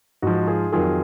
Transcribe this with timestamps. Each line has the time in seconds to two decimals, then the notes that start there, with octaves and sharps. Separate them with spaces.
0.22 G#2 F3 D#4 F#4
0.47 F4 G#4
0.72 F2 D#3 F#3 F4 G#4